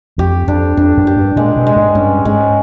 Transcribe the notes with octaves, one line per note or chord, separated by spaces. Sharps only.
F2 G4
F2 D4
F2 D4
F#2
G4
G2
A#2 G#3
B2
G#3
G#2
G2 C#4
G#2 G#3